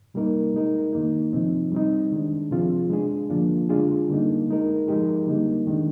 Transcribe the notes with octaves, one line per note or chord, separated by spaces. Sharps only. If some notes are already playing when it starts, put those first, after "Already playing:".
C3 G3 A#3 D#4 A#4
G#3 D#4 A#4
D#3 A#3 D#4
C3 F3 C4 D#4
G3 C4 D#4
D#3 G#3 D4
C3 F3 C4 F4 G#4
G#3 D4 G#4
D3 F3 A#3 D4 F4
D3 G#3 D4 F4 G#4
D3 G3 A#3 D#4
G#3 D#4 A#4
F3 G#3 D#4 G4 A#4
D3 G3 A#3 D#4
D#3 G#3 D4